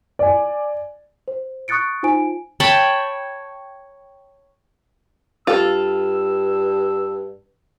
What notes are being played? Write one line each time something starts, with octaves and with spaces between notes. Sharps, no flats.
D5 G#5
C5
C#6 D#6 F#6 A6 C#7 D7
D#4 F4 C5 G#5 D7
C#5 G5 A5 B5
G2 F4 A4 E6